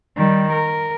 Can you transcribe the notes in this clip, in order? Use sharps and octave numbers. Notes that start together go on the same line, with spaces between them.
D#3 G3
A#4